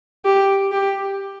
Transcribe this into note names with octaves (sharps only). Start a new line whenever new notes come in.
G4
G4